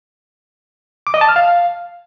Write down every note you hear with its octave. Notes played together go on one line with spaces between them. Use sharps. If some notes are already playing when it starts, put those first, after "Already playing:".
D6
D#5
A5
F6
F5